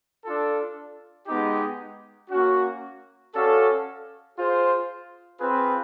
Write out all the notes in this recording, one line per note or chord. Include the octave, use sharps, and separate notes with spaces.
D4 F4 A4
G#3 B3 D#4 G4
A#3 C#4 F#4
C#4 F#4 A4 D5 F5
F4 G#4 C5
C4 F4 G#4 B4